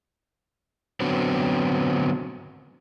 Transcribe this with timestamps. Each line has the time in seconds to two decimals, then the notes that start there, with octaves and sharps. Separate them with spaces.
1.00 D3 F#3 B3 C4